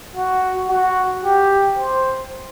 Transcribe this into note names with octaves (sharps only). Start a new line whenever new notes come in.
F#4
F#4
G4
C5